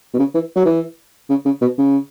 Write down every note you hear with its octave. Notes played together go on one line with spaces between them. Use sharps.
B2
C#3
E3
F#3
E3
C#3
C#3
B2
C#3